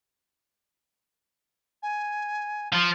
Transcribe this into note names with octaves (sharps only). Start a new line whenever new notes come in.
G#5
F3